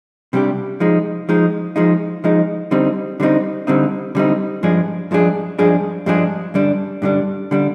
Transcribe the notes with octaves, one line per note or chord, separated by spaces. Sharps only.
C3 G3 D4 G4
F3 G#3 D#4
F3 G#3 D#4
F3 G#3 D#4
F3 G#3 D#4
D3 G3 C4 D#4
D3 G3 C4 D#4
D3 G3 C4 D#4
D3 G3 C4 D#4
G2 F3 G#3 D4 G#4
G2 F3 G#3 D4 G#4
G2 F3 G#3 D4 G#4
G2 F3 G#3 D4 G#4
G2 D3 G3 D4
G2 D3 G3 D4
D3 G3 D4